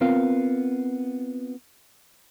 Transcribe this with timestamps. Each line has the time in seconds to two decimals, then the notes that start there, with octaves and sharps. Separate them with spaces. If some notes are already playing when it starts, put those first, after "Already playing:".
0.01 B3 C4 F4 A#4 F5